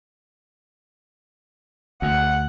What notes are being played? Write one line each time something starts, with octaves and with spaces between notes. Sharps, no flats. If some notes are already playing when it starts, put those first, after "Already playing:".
D2 F#5